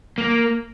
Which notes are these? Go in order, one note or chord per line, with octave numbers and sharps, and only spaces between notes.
A#3